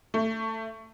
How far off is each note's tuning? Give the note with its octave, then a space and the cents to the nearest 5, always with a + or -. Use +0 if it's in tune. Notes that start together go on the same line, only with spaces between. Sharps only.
A3 +20